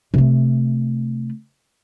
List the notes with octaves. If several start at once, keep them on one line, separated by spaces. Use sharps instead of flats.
C3 A3